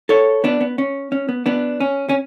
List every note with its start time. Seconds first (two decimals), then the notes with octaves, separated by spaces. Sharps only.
0.09 A4 C#5
0.44 B3 D4
0.61 B3
0.78 C#4
1.12 C#4
1.29 B3
1.46 B3 D4
1.80 C#4
2.09 C#4